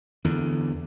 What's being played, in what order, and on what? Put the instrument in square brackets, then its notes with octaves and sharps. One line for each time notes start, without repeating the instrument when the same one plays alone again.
[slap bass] E2 D3